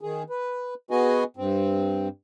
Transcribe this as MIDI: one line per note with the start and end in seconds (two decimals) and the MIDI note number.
0.01 0.23 51
0.01 0.23 68
0.30 0.74 71
0.91 1.24 59
0.91 1.24 66
0.91 1.24 68
0.91 1.24 71
0.91 1.24 75
0.91 1.24 80
1.37 2.08 43
1.37 2.08 60